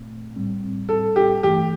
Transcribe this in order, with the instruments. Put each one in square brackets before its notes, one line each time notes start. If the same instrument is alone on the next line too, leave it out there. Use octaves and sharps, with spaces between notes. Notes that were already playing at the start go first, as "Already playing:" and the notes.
Already playing: [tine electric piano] A#1 A#2 A3 C4
A#1 A2 G3 C4
[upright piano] A4
G4
[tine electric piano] G1 G2 E3 A3 [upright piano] G4